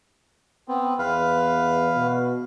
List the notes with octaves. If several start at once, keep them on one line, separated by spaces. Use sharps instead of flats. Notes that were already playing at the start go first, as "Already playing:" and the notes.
B3 C4
E2 B4 F5
B2